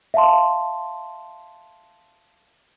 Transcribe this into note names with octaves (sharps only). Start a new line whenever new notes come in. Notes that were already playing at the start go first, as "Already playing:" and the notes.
E5 F5 A5 C6